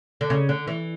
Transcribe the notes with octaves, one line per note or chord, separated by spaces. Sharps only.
D3
C#3
D3
E3